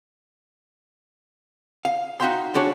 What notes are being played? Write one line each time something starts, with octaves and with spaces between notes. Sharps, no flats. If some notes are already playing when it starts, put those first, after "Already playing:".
F5
D#4 F#4 E5 F5 G5 C6
G3 G#3 D4 F#4 C#5